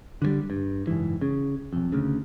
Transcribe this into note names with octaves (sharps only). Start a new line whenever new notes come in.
D3 D#3 G3
G2
F#1 G#2 E3
C#3
B1 F2
D2 C#3